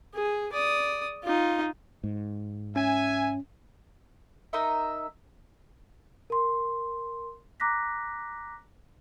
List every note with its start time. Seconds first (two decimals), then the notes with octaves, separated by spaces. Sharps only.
0.14 G#4
0.52 D5 D#6
1.23 D#4 F4
2.04 G#2
2.76 C#4 E5 G#5
4.53 D#4 A#4 D#5 E5
6.30 A#4 C6
7.60 A#5 D6 F#6 A#6 B6